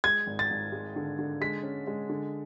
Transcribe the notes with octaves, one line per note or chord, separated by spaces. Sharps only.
G#3 G#6
G#1
A6
G#1
G#3
D3
D3
G#3 B6
C#4
G#3
D3